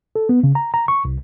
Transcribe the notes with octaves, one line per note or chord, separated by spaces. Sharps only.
A4
B3
C#3
A#5
A#5
C#6
C2